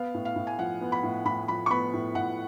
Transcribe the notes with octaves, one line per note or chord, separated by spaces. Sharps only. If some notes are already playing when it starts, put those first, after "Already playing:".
Already playing: B3 F5
A2
F5
A2
G#5
F3 F#5
B3
B5
A2
A2 B5
F3 B5
C#6
B3 B5
A2
A2 F#5